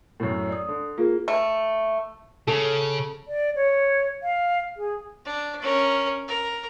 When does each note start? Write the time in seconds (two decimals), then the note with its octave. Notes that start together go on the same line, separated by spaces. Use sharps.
0.20 F#2 A2
0.49 D5 D#6
0.68 D3
0.98 A#3 F4 G#4
1.28 A3
2.47 C#3 A4
3.28 D5
3.56 C#5
4.23 F5
4.77 G#4
5.25 D4
5.62 C#4 A#4
6.28 A#4